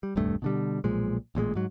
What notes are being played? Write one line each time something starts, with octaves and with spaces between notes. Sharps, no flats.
G3
D#1 C2 G2 A3
B2 D3 G3
B1 A#2 F3 G#3
A1 A#2 F#3 G#3
G#2 F#3